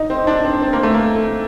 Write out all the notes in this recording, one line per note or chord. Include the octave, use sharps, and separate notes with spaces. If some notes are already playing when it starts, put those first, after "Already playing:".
Already playing: D#4
C4
D4
C4
C4
A#3
A3
A#3